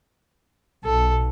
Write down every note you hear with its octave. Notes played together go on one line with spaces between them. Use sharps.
B1 A4